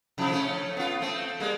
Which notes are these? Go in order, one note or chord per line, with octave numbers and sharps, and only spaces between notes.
C3 F3 E4
A3 C#4
B3 F4
A3 C4
G3 G#3 A#3